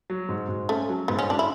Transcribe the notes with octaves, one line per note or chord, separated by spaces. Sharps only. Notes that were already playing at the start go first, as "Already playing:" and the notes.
F#3
G#2
G#2
A3 C#4
F#3
G#2 B3
C#4
G#2 D4
E4